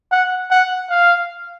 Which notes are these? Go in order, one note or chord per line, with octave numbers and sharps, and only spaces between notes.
F#5
F#5
F5